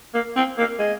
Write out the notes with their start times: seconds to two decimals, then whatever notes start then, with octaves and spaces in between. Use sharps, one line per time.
0.14 A#3
0.36 C4
0.58 A#3
0.79 G#3